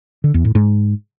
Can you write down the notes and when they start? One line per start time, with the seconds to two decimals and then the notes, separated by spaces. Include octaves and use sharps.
0.24 D3
0.34 E2
0.45 A2
0.55 G#2